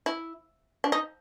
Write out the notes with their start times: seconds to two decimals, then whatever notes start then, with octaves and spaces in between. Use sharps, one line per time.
0.06 E4
0.84 D4
0.92 D#4